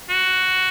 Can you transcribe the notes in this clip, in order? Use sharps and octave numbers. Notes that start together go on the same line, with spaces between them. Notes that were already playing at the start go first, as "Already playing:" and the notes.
F#4